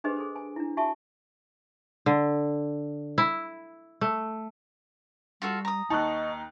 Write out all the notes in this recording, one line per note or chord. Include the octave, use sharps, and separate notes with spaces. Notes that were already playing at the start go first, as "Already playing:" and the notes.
D4 G4 G#4 B4 C5 D#5
G#4 A4 C5
G#5
D4 E4
F4 F#4 E5 G#5 A5 C#6
D3
E4
A3
G3 F4 F#4 A4
A#5 D#6
D#2 D#4 D#5 A5 C#6 F#6